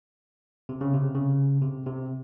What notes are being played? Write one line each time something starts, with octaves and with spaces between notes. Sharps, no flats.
C3
C#3
C3
C#3
C3
C3